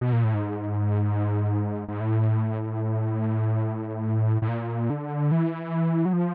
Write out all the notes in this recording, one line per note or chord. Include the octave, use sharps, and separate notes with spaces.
B2
A#2
A2
G#2
G#2
A2
A2
A#2
D3
E3
F#3
F3